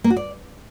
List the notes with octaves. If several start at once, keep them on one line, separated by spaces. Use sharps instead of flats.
A#3
F#4
D5